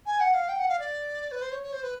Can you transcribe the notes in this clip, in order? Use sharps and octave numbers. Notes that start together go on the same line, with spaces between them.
G#5
F#5
F5
G5
F#5
F5
D5
B4
C5
C#5
C#5
C5
B4